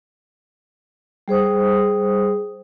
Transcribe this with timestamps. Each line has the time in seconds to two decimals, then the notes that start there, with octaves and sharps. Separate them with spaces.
1.28 G3 G#4 C5 D#6